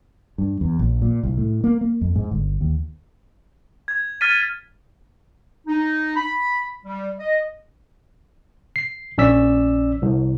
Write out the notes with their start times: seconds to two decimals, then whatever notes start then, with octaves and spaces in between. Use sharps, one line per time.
0.38 G2
0.61 E2
0.79 A#1
1.02 A#2
1.23 C2
1.38 A2
1.64 A#3
1.81 A#3
2.01 F2
2.16 G#2
2.31 G1
2.61 D#2
3.88 G#6
4.21 F6 A6 B6 D#7
5.67 D#4
6.16 B5
6.85 G3
7.19 D#5
8.76 C7
9.18 A#1 C#4 D5 E6 B6
10.02 C2